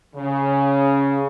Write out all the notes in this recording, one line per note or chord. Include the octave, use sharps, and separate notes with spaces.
C#3